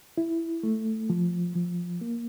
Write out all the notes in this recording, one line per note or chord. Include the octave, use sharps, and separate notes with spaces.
E4
A3
F3
F3
A#3